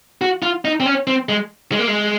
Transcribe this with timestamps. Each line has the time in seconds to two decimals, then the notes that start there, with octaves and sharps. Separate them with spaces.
0.21 F#4
0.43 F4
0.65 D#4
0.80 C4
0.86 C#4
1.07 C4
1.29 G#3
1.72 G#3
1.79 A#3
1.88 G#3